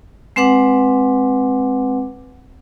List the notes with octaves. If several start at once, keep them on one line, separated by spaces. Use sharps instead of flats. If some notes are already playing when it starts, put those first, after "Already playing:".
G#3 C4 B4 F#5 D6